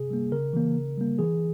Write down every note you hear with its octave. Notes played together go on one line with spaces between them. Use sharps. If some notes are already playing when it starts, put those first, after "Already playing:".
Already playing: C3 G#4
G3 A#3
C#3 A#4
E3 A#3
C#3
G3 A#3
E3 G#4